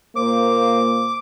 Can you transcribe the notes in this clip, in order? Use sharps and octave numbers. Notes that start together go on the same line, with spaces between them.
A#2 A#3 C5 D6